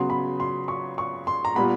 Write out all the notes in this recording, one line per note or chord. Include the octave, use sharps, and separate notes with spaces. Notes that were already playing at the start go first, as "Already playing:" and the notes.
Already playing: C#3 F#3 B3 C6
B5
C6
C#6
C#6
C6
A#5
A#2 G3 B3 B5